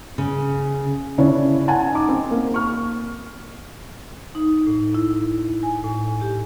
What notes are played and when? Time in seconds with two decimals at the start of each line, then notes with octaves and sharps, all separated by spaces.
0.18 C#3
1.18 C#3 C#4 D4 E4 C#5
1.68 F#5 G#5 A5
1.91 D#4 D6
2.09 C4
2.31 A#3
2.54 C#6 F6
4.35 D#4
4.67 A2
4.94 E4
5.63 G#5
5.84 A2
6.21 G4